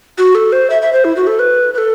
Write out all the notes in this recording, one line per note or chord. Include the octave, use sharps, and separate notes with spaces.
F#4
A4
C5
E5
E5
C5
E4
F#4
A4
B4
B4
A4